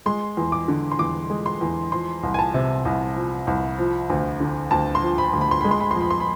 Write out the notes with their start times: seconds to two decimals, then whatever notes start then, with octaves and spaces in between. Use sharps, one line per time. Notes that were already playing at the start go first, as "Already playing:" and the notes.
0.06 G#3 C6
0.37 E2
0.52 D6
0.68 D3
0.91 C6
0.99 E2 D6
1.30 G#3
1.46 C6
1.61 E2
1.92 F3 C6
2.23 C2
2.34 G#5
2.39 A5
2.54 C3
2.85 C2
3.16 F3
3.47 C2
3.78 F3
4.10 D2
4.40 D3
4.71 D2 A5
4.95 C6
5.02 F3
5.18 B5
5.33 D2
5.41 B5
5.51 C6
5.61 G#3 B5
5.71 C6
5.81 B5
5.91 F2 C6
6.01 B5
6.10 C6
6.20 B5